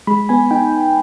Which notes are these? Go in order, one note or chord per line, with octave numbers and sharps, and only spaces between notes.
G#3 B5
B3 G#5
D#4 G5